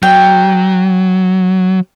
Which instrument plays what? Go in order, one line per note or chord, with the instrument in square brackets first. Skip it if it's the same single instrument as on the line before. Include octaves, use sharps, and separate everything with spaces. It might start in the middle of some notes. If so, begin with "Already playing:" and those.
[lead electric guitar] F#3 [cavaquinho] G5